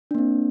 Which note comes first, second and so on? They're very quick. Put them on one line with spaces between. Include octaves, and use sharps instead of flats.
D4 A#3 C4